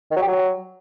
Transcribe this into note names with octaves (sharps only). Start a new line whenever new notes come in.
D#3
F#3
G4
F#3